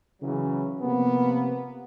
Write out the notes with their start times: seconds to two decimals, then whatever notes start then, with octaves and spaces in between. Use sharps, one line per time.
0.22 C#3 E3 F#3
0.81 C3 F3 A#3 B3